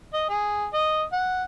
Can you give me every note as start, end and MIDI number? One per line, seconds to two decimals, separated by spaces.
0.14 0.25 75
0.29 0.66 68
0.74 1.03 75
1.13 1.44 78